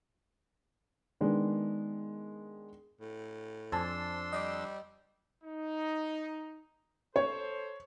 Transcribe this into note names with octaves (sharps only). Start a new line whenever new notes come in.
D#3 G#3 B3 D4
A2
F2 D4 C5 G#5 A5 C6 E6
G3 D#5 D6
D#4
A4 C5 C#5